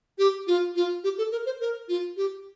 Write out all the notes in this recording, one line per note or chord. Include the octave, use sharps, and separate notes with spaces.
G4
F4
F4
G4
A4
A#4
C5
A#4
F4
G4